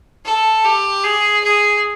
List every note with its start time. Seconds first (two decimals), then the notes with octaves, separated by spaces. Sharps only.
0.25 A4
0.64 G4
1.04 G#4
1.43 G#4